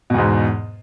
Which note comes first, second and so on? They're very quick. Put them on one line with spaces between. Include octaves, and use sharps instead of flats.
B2 E2 G#2